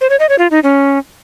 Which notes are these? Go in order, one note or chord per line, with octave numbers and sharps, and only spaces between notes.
C5
C#5
D#5
C#5
F4
D#4
C#4